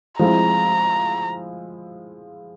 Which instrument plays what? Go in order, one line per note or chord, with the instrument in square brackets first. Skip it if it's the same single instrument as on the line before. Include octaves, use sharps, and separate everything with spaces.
[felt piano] F3 G#3 C4 E4 [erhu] A#5